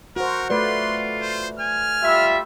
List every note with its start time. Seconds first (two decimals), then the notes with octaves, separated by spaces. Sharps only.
0.16 F#4 A#4 C5
0.50 A3 F4 B4 D5 C6
1.22 C5
1.60 G#5 F6
2.03 G3 F4 E5